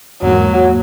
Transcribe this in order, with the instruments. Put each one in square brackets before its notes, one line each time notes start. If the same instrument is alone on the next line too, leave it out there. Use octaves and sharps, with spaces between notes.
[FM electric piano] E2 G#2 A#3 [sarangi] F#3